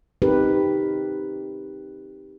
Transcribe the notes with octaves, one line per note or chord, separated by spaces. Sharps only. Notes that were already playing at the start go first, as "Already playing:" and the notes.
C4 D#4 G4 A#4 B4